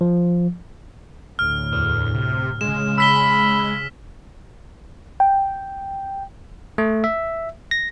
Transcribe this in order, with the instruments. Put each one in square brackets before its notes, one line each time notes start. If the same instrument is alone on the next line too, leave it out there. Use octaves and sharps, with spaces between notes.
[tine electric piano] F3
[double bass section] D2 A2 [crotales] F6
[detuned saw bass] E2
C3
[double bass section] C#3 [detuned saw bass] G#3 [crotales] E7
[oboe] B5 [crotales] E6 B6 G7
[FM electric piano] G5
[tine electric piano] A3
E5
A#6